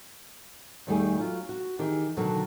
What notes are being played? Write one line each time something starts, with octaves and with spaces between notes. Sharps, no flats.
E2 D#3 G3 A3 G#4
F#3 F4
F#4
D#3 E3 G4 G#4
B2 D3 D#3 F#3 A4